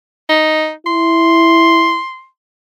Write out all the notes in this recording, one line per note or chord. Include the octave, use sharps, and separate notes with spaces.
D#4
E4 C6